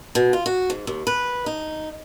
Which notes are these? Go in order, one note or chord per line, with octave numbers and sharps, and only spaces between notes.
B2
F4
F#4
G#2
D#2
B4
D#4